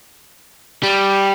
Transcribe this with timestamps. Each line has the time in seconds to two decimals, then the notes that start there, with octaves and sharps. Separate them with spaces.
0.83 G3